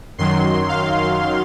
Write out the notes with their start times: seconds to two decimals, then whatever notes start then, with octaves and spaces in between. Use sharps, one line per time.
0.18 F#2 D#3 F#3 C6
0.69 F5